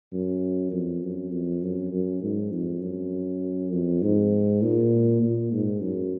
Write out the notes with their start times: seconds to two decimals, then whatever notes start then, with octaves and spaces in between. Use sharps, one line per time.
0.13 F#2
0.72 F2
1.03 F#2
1.32 F2
1.63 F#2
1.93 F#2
2.23 G#2
2.53 F2
2.82 F#2
3.72 F2
4.02 G#2
4.63 A#2
5.23 A#2
5.52 G#2
5.82 F#2